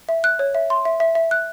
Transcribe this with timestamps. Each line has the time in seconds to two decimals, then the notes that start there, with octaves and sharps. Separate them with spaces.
0.09 E5
0.24 F#6
0.39 C#5
0.55 E5
0.70 C6
0.85 E5
1.00 E5
1.15 E5
1.31 F#6